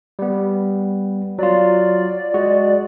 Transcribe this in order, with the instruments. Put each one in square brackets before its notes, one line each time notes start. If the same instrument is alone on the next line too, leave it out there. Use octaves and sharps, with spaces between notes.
[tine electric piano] G3 B3
[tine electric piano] F#3 F4 [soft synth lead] D5
[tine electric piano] G#3 F#4